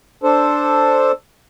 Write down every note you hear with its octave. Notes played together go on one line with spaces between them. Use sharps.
D4 A4 C5